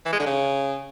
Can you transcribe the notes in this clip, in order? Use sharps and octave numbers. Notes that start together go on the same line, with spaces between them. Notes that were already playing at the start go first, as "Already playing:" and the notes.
E3
G#3
D3
C#3